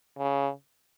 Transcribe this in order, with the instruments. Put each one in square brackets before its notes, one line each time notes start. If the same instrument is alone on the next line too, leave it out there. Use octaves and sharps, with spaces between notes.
[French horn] C#3